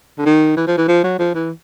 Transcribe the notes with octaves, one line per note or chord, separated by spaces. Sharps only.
D3
D#3
E3
F3
E3
F3
F#3
F3
E3